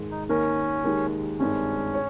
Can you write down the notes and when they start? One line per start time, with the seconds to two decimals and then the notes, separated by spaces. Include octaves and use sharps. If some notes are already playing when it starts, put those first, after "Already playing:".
Already playing: G#2 D#3 G#3
0.11 D#4
0.29 D#2 D#3 A#3 C#4 D#4 A#4
0.84 D#2 D#3 G#3 D#4 G4
1.39 G#1 G2 D#3 G#3 C#4
1.94 C#5